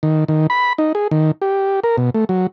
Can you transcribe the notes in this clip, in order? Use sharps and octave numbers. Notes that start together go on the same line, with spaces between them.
D#3
D#3
B5
D#4
G#4
D#3
G4
A#4
B2
A3
F#3